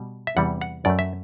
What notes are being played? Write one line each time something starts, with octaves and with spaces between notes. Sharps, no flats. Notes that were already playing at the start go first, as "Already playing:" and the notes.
Already playing: B2 G3
E5
E2 C3 E3 G3 F#5
F#5
F#2 F#3 A3 D5
E5